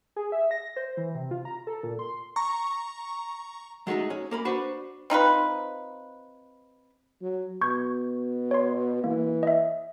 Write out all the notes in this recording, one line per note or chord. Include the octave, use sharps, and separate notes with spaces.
G#4
E5
A#6
C5
E3
C3
F4
A#5
A4
A#2
C6
A#5 C#6
F#3 G#3 A3 D#4 G#4
C#4
A#3 A#4 B5
D4 F#4 B4 C5
C4 D#4 F4 B4
F#3
B2 C#6 G6 G#6
C#5 C6
E3 A#3
D#5 E5